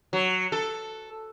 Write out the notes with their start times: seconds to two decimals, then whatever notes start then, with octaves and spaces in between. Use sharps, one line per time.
0.13 F#3
0.52 A4